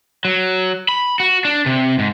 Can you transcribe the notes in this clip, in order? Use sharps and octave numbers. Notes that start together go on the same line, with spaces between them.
F#3
B5
F#4
D4
C3
G#2